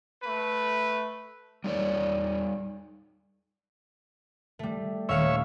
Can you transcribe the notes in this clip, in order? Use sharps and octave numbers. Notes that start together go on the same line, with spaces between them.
A3 B4
G3 D#4 C#5 D5
G3 A3
D#1 C#5 E5 F5 C#7